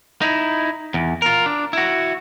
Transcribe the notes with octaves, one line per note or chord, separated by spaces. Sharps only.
D#4 E4
E2
F4 A#4
D4
E4 F#4